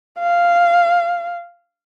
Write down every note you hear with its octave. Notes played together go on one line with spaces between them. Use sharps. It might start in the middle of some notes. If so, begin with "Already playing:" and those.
F5